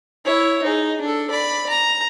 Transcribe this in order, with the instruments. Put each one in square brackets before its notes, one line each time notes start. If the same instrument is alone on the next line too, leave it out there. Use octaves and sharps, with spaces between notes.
[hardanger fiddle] E4 C#5
D#4 G#4
D4 A4
D5 B5
A#5